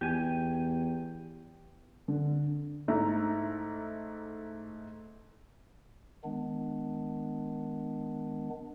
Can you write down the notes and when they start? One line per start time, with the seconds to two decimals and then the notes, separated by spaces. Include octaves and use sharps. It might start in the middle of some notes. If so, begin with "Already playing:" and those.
0.01 E2 G4 G#5
2.08 D3
2.88 G#2 A3 E4 A#5
6.24 D#3 G#3 B3 D4